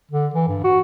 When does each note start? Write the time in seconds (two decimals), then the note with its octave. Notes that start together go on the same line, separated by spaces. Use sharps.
0.11 D3
0.34 E3
0.48 G2
0.64 F#4